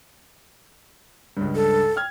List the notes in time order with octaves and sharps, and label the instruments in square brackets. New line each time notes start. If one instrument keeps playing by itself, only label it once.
[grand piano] C#2 G2
[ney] A4
[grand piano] G5 F6 G#6